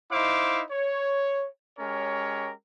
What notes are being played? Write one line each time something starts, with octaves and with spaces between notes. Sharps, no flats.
D#4 E4 C5 F5 D6
C#5
G#3 C#4 G4 A#4 C#5